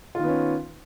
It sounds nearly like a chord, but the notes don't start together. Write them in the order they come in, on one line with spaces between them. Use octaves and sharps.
F4 D#3 B3 C#4